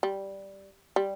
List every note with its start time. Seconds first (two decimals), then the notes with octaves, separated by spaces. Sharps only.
0.03 G3
0.96 G3